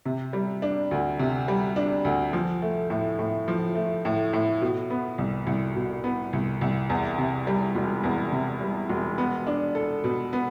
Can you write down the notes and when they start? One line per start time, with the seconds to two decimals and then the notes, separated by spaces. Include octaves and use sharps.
0.05 C3
0.33 G3
0.62 D4
0.91 D2
1.19 C3
1.48 G3
1.76 D4
2.05 D2
2.33 F3
2.62 A3
2.90 A2
3.19 A2
3.48 F3
3.75 A3
4.05 A2
4.33 A2
4.62 B2
4.90 B3
5.18 C2
5.47 C2
5.75 B2
6.04 B3
6.33 C2
6.61 C2
6.89 E2
7.18 C3
7.47 G3
7.75 E1
8.03 E2
8.32 C3
8.61 G3
8.89 E1
9.18 B3
9.47 D4
9.75 A4
10.04 B2
10.33 B3